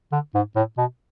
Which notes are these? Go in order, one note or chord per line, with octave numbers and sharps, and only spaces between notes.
D3
G#2
A2
B2